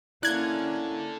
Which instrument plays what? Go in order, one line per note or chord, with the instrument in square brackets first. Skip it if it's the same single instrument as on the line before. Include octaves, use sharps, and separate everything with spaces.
[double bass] A#3 C#4 [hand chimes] E4 [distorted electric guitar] A4 D5 [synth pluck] F#6 G#6